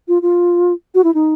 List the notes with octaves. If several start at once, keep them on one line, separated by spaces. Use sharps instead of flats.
F4
F4
F#4
E4
D#4